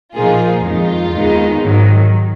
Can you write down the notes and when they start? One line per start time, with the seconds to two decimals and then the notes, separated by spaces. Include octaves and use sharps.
0.14 A#2 F3 A#3 D#4 F4 G#4
0.63 F2 D#3 G#3 D#4 F4
1.13 D#2 D#3 G#3 B3 D#4
1.62 G#2 D#3 F#3